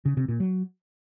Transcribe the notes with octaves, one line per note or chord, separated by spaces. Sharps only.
C#3
C3
A#2
F#3